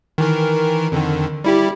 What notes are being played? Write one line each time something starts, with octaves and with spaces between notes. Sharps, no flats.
D#3 E3 A#4
F2 D3 D#3
G3 E4 G4